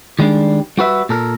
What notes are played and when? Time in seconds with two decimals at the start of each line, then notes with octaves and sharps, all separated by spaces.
0.19 D#3 G3 G#3 D4
0.78 G3 F#4 B4 E5
1.09 A#2 A4 A#4